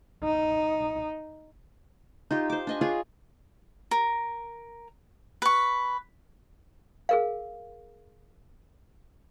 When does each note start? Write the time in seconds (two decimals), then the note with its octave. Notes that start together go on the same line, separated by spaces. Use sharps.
0.24 D#4
2.31 D#4 F4 G4
2.50 C5 D6
2.67 D4 D#5 G#5
2.81 F4 G#4 C#5 G#5
3.91 A#4
5.42 B4 C#6
7.09 G#4 A#4 F5